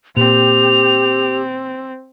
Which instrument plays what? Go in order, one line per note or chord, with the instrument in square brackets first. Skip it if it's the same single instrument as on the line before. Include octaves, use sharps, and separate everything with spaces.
[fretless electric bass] A#2 [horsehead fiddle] C4 [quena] G4 [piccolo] F7